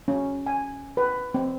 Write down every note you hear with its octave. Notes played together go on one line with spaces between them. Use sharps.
C#4
G#5
B4
C4